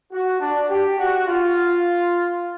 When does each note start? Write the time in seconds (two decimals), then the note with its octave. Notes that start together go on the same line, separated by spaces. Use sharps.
0.13 F#4
0.41 D4
0.69 G4
0.99 F#4
1.27 F4